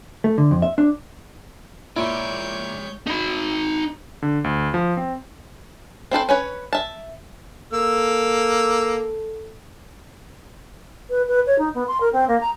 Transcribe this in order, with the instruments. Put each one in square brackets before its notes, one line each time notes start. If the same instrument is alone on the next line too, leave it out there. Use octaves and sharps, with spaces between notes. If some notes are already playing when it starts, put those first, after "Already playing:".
[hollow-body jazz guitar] A3
D3
F2
E5
D4
[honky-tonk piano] A#2 D7 [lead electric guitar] G#3 D5 [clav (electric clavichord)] E4 [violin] C#5 G6
[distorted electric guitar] D#4 B5
[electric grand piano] D3
D2
F3
C4
[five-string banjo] C4 E4 A4 C5
C#4 B4 C#5
E5 A5
[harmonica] A#3 E6 [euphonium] A4
[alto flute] B4
B4
C#5
D#4
B3
C6
A#4
C4
A#3
A#5